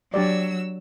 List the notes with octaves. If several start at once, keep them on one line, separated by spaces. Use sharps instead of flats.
F#3 D4 G4 D5 E6